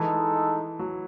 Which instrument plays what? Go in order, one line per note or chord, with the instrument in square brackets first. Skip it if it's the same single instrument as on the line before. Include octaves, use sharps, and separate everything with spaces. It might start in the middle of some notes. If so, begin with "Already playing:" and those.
Already playing: [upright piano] E3 [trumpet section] G#3 D#4 A4
[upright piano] F#3